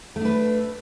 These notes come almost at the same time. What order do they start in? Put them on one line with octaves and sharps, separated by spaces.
A3 D4 B4